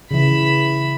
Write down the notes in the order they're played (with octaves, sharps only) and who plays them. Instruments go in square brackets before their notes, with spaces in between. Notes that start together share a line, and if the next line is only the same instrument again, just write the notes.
[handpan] C#3 E3 [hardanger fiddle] E5 B5